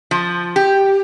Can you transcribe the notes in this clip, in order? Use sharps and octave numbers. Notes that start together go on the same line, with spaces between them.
F3
G4